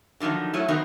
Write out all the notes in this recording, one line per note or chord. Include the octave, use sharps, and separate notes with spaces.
D3 D#3 F3 F#3 D#4
F#3 A3 C#4 E4
D#3 F#3 B3 C4 D#4 A#4